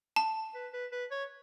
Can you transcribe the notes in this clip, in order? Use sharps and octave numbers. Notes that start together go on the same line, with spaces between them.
A5
B4
B4
B4
C#5